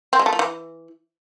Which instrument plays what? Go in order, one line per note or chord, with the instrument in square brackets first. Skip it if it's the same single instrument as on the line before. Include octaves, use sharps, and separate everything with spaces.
[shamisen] C4
G#3
A3
F3
E3